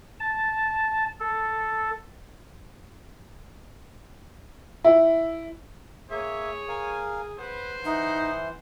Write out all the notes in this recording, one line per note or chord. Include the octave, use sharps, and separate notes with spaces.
A5
A4
E4
A#3 G#4 C#5 E5
A#4 F5 G#5
B4 C5 F#5 B5
E3 D#4 F#5